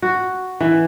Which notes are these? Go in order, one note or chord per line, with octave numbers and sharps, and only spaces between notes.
F#4
E3